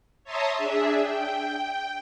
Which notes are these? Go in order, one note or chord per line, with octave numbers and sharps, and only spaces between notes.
C#5 E5 A5 A#5 C6 D#6
D4 G#4 E5
G5